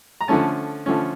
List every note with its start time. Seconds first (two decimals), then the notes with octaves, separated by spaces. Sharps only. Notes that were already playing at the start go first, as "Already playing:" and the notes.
0.21 A#5
0.28 D3 F3 A3 C#4 A5
0.86 D3 F3 A3 C#4